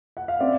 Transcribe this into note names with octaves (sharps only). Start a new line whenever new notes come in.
F#5
F5
C4 D5 E5